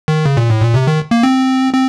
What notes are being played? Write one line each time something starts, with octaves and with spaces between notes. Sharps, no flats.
D#3
C#3
A#2
A2
A#2
C3
D#3
A#3
C4
C4